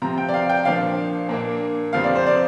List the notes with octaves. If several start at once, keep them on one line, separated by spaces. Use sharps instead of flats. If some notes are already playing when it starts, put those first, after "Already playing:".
C3 F3 C4 A#5
G5
D5
F5
G5
A#2 F3 D4 F5
A#2 A#3 D4
F2 C3 F3 C4 F5
D5
C5
D5